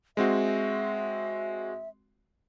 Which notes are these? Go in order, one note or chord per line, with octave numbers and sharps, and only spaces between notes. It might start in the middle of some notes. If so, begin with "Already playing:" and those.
G#3 C4 F#4 E5